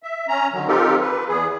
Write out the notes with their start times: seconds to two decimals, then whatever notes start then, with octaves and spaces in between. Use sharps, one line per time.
0.03 E5
0.28 C#4 A#5
0.53 D3 D#3 F#3
0.68 C4 D#4 F4 G4 A4 A#4
1.01 B4
1.28 E2 E3 G#4